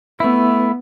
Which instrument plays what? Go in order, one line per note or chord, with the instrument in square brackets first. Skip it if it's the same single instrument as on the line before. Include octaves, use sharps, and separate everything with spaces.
[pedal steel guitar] A3 E4 [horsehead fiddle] B3